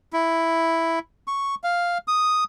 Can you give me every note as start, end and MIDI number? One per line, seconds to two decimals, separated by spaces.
0.13 0.99 64
1.28 1.55 85
1.64 1.98 77
2.08 2.44 87